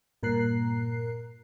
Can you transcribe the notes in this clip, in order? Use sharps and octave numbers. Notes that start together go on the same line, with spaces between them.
G2 A#2 A#4 A#5 F#6 C7